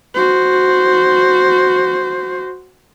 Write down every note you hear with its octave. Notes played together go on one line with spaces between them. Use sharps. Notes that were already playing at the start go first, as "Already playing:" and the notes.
F#4 C5